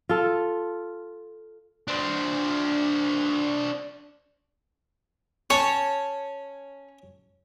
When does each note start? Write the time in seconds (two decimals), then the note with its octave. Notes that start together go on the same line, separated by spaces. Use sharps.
0.09 F4 A4
1.88 D4 C5
5.50 C#4 C#5 A5